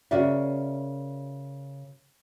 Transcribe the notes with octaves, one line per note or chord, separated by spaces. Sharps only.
C#3 F#4 A#4 D5 E5